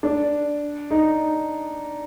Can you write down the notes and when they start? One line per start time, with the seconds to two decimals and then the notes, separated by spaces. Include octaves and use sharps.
0.03 D4
0.90 D#4